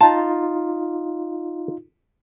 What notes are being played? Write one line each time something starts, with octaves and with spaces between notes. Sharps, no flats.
D#4 F4 A5